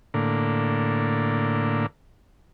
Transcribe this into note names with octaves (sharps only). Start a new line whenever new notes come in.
A2 D3 A#3